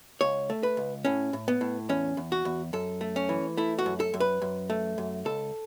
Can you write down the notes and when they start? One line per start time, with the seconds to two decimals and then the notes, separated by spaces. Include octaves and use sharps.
0.21 C#2 C#5
0.50 A3
0.63 B4
0.77 C#2
1.05 A2 C#4
1.33 A2
1.48 B3
1.61 A2
1.89 E2 C#4
2.17 E2
2.32 F#4
2.45 E2
2.73 F#2 A4
3.01 A3
3.16 C#4
3.29 E3
3.57 A3 E4
3.79 F#4
3.86 F#2
4.00 A4
4.14 F#2
4.20 B4
4.42 F#2
4.70 A3
4.98 F#2
5.25 C#2 A4